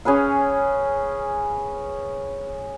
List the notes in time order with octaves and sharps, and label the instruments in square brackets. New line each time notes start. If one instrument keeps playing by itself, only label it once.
[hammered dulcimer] C#4 G#4 B4 F5